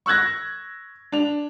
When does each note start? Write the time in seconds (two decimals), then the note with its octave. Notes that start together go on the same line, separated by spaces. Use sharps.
0.06 C#6 E6 F#6 G#6 A#6
1.12 D4 F7